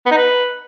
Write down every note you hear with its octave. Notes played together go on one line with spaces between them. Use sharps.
B3
D#4
B4